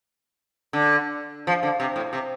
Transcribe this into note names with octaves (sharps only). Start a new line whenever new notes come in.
D3
F3
D3
C3
A2
C3